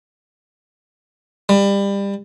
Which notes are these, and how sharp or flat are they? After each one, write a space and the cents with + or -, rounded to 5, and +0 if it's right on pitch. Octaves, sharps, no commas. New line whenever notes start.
G3 +25